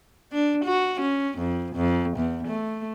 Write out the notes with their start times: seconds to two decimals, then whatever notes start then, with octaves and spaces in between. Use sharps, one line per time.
0.33 D4
0.65 F#4
1.01 C#4
1.38 F2
1.76 F2
2.18 E2
2.48 A3